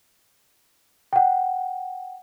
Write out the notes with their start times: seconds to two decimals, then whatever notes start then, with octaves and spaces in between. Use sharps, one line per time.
1.13 F#5 G5